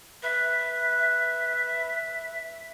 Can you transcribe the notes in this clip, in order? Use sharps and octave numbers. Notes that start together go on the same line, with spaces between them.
B4 E5